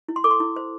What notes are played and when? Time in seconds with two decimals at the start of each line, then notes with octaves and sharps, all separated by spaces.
0.08 E4
0.16 C6
0.24 A4 D6
0.31 C6
0.40 E4
0.56 C5